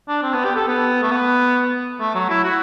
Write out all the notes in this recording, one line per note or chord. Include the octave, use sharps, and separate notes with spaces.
D4
C4
B3
G4
A4
B3
A3
B3
A3
F#3
E4
F#4